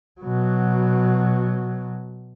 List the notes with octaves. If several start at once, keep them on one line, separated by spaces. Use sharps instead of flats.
B2 F#3